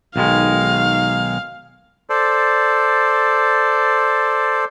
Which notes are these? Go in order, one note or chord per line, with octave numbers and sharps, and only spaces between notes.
B1 D#3 G#3 F5
A4 C5 D5